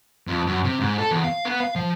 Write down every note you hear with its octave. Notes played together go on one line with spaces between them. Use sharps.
F2
F#2
C3
G#2
A4
E2
F5
B3
F5
F3